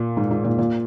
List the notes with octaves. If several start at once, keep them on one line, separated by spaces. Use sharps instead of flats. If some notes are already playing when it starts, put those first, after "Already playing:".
Already playing: A#2
G#2
G#2
A#2
A#2